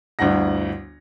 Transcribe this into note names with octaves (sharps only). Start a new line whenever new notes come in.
G1 D2 E4 F#5 A#6